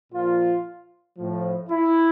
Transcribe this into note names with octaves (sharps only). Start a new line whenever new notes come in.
A#2 F3 F4
A2 F3
E4